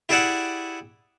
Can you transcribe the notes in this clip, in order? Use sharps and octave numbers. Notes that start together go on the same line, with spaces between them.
E4 G4 G#4 D5 E5 F#5